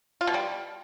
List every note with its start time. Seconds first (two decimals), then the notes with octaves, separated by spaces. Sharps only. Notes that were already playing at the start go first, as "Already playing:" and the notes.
0.21 F4
0.27 B2
0.34 G3